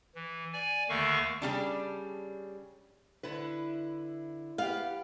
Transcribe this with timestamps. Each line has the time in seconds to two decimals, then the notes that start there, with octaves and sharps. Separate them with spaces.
0.15 E3
0.53 D5 G#5
0.89 D#2 D3 D#3 A3 F5 C#6
1.42 C#3 G3 D4
3.23 D3 E4 B4
4.58 B3 G4 F5